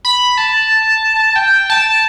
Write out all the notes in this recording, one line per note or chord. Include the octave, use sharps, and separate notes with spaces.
B5
A5
G5
A5